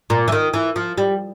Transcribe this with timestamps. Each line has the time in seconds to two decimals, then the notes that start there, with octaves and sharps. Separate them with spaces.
0.10 A#2
0.28 E3
0.32 D#3
0.54 E3
0.76 F3
0.98 G3